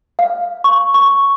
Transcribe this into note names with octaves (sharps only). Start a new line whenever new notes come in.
F5
C#6
C#6